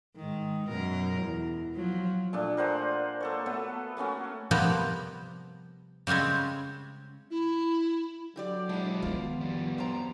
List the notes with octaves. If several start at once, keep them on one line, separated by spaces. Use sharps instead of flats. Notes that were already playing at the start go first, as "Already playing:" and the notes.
G#2 D#3
F#2 B2 A#4
E2
F3 F#3
A#2 A3 D4
A#4 C5 F#5 G#5
A#3 A4 C#5
A3 B3 F#4
A3 A#3 C#4 F#4
C3 F3 G3 A#3 B3
C#3 G3 G#3 C4 C#4
E4
D3 F#3 G4 D5
G#3 B3 D4 E4
D#3 F3 B3 F4
F2 G3
F#2 C5 A#5